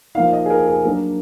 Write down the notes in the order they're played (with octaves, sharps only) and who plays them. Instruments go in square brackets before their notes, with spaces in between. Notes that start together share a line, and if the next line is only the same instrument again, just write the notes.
[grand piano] F3 A#3 D#4 F5
D#5
G#4
A#4
G#4
F#3 A#3 D4 A#4